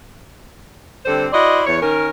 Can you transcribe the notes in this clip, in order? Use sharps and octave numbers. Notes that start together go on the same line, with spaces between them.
D3 G3 C4 A4 C5
E4 F#4 C5 D5 D#5
E2 C#5
D#3 C#4 A#4